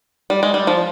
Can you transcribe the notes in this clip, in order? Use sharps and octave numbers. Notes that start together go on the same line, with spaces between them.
G3
G#3
G3
F3